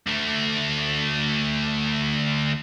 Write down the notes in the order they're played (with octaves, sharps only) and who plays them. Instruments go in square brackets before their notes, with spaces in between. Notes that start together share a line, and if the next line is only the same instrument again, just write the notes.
[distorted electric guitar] D2 A3